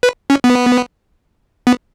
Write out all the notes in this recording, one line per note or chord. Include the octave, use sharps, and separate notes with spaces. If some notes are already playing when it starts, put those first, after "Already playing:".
B4
C#4
B3
B3